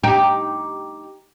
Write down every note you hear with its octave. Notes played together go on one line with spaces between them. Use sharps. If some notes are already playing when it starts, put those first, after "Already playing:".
D#4 G4